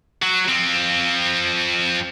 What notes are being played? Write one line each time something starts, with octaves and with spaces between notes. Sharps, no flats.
F#3
F3 C4